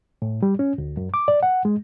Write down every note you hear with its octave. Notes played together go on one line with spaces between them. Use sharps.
A2
G3
C#4
D2
F#2
D6
D5
F#5
G#3